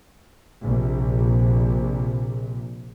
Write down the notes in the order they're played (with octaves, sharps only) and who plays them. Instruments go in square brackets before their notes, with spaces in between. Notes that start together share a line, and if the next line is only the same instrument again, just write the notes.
[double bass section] A#1 C3